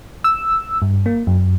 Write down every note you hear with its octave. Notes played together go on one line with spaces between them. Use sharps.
E6
G2
A#3
F#2